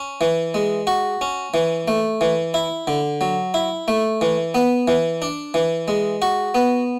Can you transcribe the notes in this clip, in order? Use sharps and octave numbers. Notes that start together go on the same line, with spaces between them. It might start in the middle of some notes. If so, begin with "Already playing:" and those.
Already playing: C#4
E3
G#3
F#4
C#4
E3
A3
E3
E4
D3
F#3
E4
A3
E3
B3
E3
D4
E3
G#3
F#4
B3